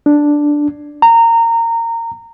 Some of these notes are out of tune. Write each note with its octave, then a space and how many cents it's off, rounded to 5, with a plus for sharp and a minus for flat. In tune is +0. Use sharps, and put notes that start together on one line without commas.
D4 +0
A#5 -20